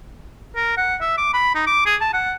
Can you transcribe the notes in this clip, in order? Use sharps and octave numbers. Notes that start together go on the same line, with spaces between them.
A#4
F#5
E5
D6
B5
D#4
D6
G#4
A5
F#5